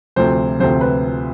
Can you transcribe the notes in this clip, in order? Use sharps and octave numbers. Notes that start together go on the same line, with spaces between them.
D2 C3 F3 C5
D2 C3 F3 C5
B4